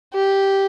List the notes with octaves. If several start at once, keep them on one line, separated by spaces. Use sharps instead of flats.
G4